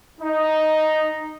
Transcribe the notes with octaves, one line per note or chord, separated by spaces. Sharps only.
D#4